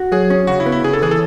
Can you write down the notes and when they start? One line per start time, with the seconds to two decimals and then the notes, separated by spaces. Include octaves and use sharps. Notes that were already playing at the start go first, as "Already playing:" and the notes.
Already playing: F#4
0.12 F#3 G#4
0.30 C#4
0.47 C#3 F#4
0.60 E4
0.66 B3
0.72 E4
0.84 C#3 G#4
0.93 A4
1.02 E3 G#4
1.11 A4